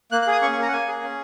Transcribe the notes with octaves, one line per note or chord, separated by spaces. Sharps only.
A#3 F#6
F#6
G#4 D#6
C#4 C#6
C#6
A#3 A#5
F#5
A#3 G#5
G#4
C#4